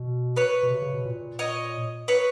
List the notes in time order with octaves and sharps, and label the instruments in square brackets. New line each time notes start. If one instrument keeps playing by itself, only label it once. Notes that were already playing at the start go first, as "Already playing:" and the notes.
Already playing: [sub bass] B2
[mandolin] B4 C#5
[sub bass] B2
C3
C#3
B2
A#2
[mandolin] C#5 D#5
B4 C#5